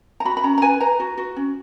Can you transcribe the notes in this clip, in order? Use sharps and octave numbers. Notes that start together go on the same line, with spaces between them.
A#5
F#4 B5
B5
C#4 A#5
A#5
B4 G#5
B4 A#5
F#4
F#4
C#4